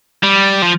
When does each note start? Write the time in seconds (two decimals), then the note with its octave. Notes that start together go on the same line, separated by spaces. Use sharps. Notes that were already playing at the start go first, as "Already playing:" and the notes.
0.23 G3
0.62 F3